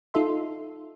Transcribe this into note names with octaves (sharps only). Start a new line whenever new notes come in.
D#4 F4 A4 E5 C6